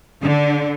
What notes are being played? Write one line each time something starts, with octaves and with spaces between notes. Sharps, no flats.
D3